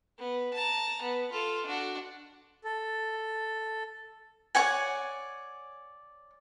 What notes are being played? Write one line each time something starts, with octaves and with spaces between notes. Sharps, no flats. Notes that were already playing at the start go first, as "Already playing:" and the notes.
B3
A5 A#5
B3
F4 A4
D4 F#4
A4
C#5 D5 F#5 G#5